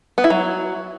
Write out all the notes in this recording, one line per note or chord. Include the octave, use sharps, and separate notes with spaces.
B3
E4
F#3